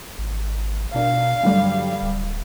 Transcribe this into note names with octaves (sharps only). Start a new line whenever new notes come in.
G#1
B2 D4 A#4 F5
G2 D3 F#3 G3
D1